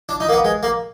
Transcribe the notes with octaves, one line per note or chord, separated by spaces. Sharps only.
D4
D#4
A#3
B3
G#3
A#3